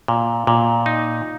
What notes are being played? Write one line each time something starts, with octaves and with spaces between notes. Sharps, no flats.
A#2
A#2
D#4